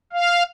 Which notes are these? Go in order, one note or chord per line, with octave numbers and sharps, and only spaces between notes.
F5